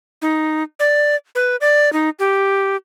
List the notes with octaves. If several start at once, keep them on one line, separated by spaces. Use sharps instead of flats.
D#4
D5
B4
D5
D#4
G4